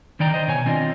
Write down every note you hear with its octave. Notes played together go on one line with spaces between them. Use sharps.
D3 D#3 D5 G5 A#5
C5 D#5
B2 C#5 G#5
D#3 C4 D4 F4 D5 D#5